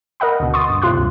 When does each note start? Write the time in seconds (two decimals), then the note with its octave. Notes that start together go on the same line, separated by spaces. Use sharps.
0.20 A#4 D#5 F#5 B5
0.40 D2 B2
0.54 C6 C#6 D#6 A6
0.69 G2
0.82 B1 A2 C3 F4 C6 F#6
0.94 D2 G2